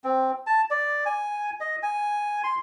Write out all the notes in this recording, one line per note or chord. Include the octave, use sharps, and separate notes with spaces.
C4
A5
D5
G#5
D#5
G#5
C6